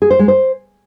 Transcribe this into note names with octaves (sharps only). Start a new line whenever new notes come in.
G#4
C5
G#3
C5